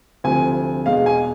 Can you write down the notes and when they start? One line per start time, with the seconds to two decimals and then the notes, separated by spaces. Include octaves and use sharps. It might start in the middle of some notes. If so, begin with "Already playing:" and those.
0.24 D2 C3 F3 G#5
0.86 E2 B2 G#3 F5
1.06 G#5